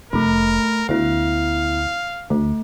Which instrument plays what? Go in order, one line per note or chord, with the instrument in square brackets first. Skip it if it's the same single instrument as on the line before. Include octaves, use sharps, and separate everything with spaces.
[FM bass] F1 [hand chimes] A3 B5 [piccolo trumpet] A#4
[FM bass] D2 [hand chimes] B3 E4 [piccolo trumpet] F5
[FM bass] D2 [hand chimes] A3